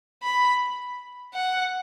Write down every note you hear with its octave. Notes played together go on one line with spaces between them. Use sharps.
B5
F#5